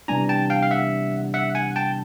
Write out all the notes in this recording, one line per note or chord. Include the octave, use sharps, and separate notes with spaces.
C3 E3 G3 B3 D4 G#5 A#5
G5 A5
F5 G5
F5
E5 F#5
E5 F#5
F#5 G#5
G5 A5